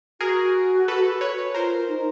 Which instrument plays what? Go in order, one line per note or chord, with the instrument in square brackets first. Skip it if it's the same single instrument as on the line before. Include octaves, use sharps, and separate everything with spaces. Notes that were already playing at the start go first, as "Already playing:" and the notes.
[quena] F#4 [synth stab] G#4 A#4
[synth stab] A4 B4
B4 C#5
[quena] F4 [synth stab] A#4 C5
[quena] D#4